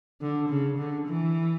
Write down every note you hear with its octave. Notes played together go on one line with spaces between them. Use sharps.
D3
C#3
D3
E3